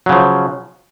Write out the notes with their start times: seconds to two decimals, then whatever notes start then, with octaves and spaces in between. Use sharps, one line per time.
0.06 F#3
0.09 C#3
0.12 F3